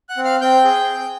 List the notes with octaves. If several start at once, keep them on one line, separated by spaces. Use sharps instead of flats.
F#5 F#6
C4
F5 F6
C4 G5 G6
G#4